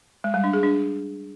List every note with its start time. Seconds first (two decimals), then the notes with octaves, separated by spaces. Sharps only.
0.24 G#3
0.34 G3
0.44 D4
0.53 G#4
0.63 D4